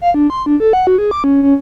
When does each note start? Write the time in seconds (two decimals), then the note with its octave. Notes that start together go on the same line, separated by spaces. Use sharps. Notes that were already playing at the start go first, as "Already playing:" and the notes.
0.01 F5
0.14 D4
0.30 C6
0.46 D4
0.60 A4
0.73 F#5
0.87 F#4
0.98 G#4
1.11 D6
1.24 C#4
1.43 C#4